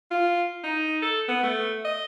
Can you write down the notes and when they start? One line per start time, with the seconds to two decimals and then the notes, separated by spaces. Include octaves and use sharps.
0.11 F4
0.64 D#4
1.02 A4
1.28 B3
1.43 A3
1.85 D#5